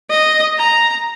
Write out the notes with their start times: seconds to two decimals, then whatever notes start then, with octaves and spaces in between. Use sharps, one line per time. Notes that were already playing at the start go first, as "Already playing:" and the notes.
0.10 D#5
0.58 A#5